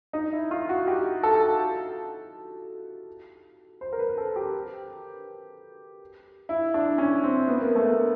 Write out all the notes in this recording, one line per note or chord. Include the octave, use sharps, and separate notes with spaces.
D#4
E4
F4
F#4
G4
A4
C5
A#4
B4
A4
G4
E4
D4
C#4
C4
B3
A#3
A3
A#3